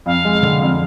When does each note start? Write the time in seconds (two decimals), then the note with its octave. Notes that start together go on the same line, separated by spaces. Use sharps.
0.06 F2 F5
0.25 G#3
0.43 D3
0.61 F2